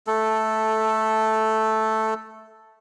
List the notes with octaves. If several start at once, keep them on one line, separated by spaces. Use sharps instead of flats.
A3 A4